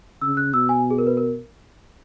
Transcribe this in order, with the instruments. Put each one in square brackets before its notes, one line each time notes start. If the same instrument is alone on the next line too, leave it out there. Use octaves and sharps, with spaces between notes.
[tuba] C#3 [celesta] E6
[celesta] F#6
[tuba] B2 [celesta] E6
[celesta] G#5
G#4
A#4
B4
A#4